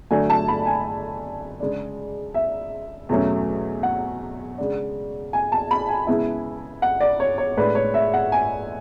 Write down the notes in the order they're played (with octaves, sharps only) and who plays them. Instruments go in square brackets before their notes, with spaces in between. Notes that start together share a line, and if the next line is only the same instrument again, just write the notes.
[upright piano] D3 F#3 A3 D4 G#5
A5
B5
G#5
C#3 G#3 D4
E5
E2 B2 F#3 A3 C#4
F#5
C#3 G#3 D4
G#5
A5
B5
G#5
C#3 G#3 B3 E4
F#5
D5
C#5
C#5
A2 G#3 D4 B4
C#5
E5
F#5
G#5